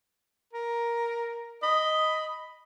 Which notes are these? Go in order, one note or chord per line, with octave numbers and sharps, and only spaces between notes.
A#4
D#5 B5